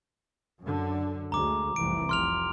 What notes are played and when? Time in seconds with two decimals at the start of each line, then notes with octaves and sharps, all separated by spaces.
0.61 F#2 D3
1.32 D2 G#3 A#5 D6
1.76 F1 C2 E3 D7
2.09 F1 C6 F6 F7